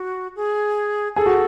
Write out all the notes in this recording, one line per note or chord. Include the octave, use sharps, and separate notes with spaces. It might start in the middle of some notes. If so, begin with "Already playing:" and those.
Already playing: F#4
G#4
G#4 A4
F#4